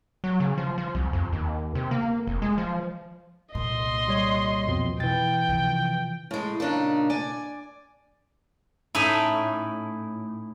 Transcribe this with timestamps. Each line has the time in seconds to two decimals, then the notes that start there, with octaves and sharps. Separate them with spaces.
0.24 F#3
0.40 C#3
0.58 F3
0.78 F3
0.95 C2
1.13 F2
1.33 D#2
1.75 C3
1.91 A#3
2.27 F1
2.42 G#3
2.58 F3
3.55 C2 A#2 D#5 C6
4.08 G3 C#5
4.67 F2 B2 F3
5.00 B2 E3 G5 A6
5.49 C3 F3
6.31 A2 G#3
6.60 A#2 C#3 D4 D#4
7.10 D5 G#5
8.95 A2 A3 C#4 D#4 E4